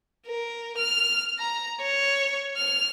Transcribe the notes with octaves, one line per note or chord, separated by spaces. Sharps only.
A#4
F6
A#5
C#5
F6